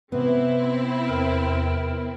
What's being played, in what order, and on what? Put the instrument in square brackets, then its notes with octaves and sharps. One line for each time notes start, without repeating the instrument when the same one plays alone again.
[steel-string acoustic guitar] C3 B3 [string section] C4 E4
[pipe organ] E2 A#4 G5